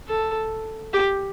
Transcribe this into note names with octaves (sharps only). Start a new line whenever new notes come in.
A4
G4